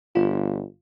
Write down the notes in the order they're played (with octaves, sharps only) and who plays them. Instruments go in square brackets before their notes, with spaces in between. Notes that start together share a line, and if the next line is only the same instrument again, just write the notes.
[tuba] G1 [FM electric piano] F4